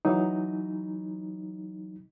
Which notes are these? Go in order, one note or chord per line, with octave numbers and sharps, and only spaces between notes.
E3 F#3 D#4